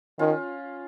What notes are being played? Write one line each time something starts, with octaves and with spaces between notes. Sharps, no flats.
D#3 C#4 F4